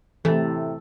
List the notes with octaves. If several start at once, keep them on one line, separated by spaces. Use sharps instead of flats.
A2 C3 E3 A3